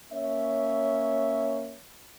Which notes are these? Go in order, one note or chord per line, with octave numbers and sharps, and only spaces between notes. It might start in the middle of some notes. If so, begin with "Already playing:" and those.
A#3 C#4 C#5 E5